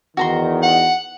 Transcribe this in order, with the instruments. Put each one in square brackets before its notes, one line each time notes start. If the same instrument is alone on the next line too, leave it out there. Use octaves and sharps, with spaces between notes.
[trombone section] E2 D#3 [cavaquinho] F#4 A#5 C6
[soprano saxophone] F#5